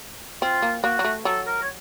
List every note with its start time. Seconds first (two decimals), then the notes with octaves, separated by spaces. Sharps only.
0.42 C4 F4
0.62 A#3
0.84 A#3 F#4
0.99 F#3
1.04 A3
1.25 F#3 A4
1.47 A#4
1.62 C#5